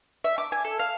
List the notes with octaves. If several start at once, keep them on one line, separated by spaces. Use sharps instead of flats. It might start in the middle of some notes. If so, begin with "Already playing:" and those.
E5
D6
G#5
A4
F5